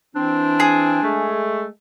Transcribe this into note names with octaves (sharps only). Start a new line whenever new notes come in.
E3 C4 D4
G#4
G#3 A3